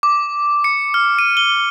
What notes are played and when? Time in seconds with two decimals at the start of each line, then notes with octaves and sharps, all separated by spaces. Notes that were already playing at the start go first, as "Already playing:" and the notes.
0.03 D6
0.64 C#7
0.94 F6
1.19 D#7
1.37 G7